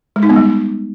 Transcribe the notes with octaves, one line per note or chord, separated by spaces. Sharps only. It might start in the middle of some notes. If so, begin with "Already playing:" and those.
G#3
D#4
B3
G3